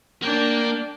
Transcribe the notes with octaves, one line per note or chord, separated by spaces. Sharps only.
A#3 D4 G5